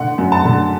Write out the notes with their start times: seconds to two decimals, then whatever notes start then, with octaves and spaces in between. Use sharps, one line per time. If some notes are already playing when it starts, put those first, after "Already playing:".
Already playing: D3 F#5
0.18 F#2
0.32 A5
0.45 D3